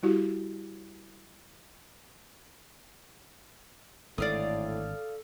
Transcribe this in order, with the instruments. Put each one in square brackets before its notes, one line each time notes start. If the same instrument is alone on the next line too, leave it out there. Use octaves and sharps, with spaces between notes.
[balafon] G3 E4 F#4 G4
[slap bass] G#1 D3 [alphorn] A2 [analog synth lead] A4 [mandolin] D5 F5 D#6